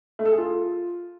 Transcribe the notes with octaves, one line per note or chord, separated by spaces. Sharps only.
A3
A4
G#4
F4